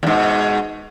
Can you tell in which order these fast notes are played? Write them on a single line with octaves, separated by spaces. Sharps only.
E2 G#2 B2